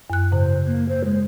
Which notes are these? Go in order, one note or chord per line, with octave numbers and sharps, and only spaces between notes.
F#2 F#6
G#2 C#3 C5
A#3
C5
G#3